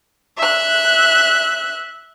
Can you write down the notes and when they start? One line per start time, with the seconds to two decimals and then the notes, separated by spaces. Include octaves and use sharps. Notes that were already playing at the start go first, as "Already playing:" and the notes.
0.39 E5 F#6